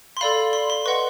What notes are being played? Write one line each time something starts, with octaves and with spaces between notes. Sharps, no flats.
C6
A4 D5 F5 B5
C6
C6
B4 D#5 F#5 C#6